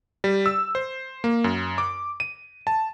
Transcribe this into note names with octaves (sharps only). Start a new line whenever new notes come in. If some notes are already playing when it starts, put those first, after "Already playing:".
G3
E6
C5
A#3
F#2
D6
D#7
A5